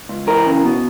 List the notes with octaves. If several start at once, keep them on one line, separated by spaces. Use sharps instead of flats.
C#2
E3 A#4
C#3
B2